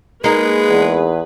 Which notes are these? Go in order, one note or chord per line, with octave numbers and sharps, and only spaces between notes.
G#3 A#3 D#4 G#4 B4
E2